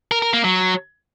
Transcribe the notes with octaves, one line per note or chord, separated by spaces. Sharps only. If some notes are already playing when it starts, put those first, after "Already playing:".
A#4
A#4
A#3
F#3